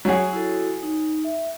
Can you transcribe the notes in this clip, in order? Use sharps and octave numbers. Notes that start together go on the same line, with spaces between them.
F#3 C#4 G#4
E4 F#4 A4
D#4
E5